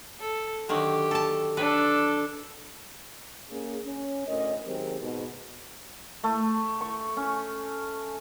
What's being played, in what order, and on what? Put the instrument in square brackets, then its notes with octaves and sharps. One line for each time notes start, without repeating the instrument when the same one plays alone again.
[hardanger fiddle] A4
[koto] D3 D#3 F#3 [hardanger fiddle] G4
[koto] A4 A5
[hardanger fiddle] D4 A4 [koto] B4
[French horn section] A#3 C#4 G#4
C#4
D2 A2 C#4 A#4 D#5
D#3 F#3 G#3 C4 G4 A#4
G#2 B2
[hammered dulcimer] A3
C#6
C#4